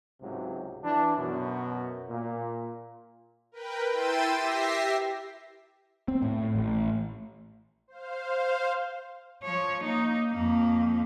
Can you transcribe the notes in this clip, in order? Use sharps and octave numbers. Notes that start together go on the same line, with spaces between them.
C#2 G#2 C3 F#3
E3 D4
F#2 B2
A#2
A#4 B4 G5
E4 G5 C6 E6 A6 D#7
G4 E5 A#6 C7
C4
A2
A1
C5 F5
F3 C#5
A#3 D#4
F2 A#3